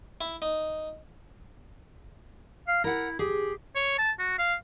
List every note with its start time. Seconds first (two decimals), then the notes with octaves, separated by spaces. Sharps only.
0.21 E4
0.42 D#4
2.68 F5
2.84 E4 A#4 F#5
3.19 G4 G#4
3.75 C#5
3.98 A5
4.19 F#4
4.39 F5